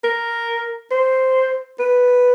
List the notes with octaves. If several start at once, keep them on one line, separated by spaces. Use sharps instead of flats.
A#4
C5
B4